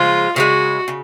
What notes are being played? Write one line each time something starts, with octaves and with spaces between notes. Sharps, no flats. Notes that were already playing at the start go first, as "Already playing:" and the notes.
Already playing: C#3 F3 G#3 F4
C#3 F3 G#3 F#4
C#3